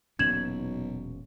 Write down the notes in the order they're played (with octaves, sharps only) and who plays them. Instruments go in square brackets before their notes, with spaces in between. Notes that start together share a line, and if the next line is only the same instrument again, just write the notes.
[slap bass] E1 A#2 C#4 [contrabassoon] B1 [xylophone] G#6 E7 F#7